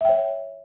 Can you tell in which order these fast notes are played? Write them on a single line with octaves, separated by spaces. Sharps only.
E5 G5 C#5